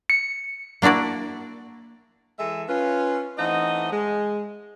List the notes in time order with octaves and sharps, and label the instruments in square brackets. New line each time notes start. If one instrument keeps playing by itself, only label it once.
[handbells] C#7
[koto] A#3 D4 E4 F#4 D5
[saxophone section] E3 G#3 A4 E5
C#4 F4 B4
E3 A3 C4 D#4 D#5 F#5
G#3